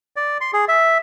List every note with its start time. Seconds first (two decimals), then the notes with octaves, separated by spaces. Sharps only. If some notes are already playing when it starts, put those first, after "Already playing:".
0.16 D5
0.41 C6
0.53 G#4
0.68 E5